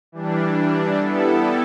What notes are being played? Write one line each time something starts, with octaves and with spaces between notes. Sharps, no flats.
E3 G3 D4
G3 B3 E4 A4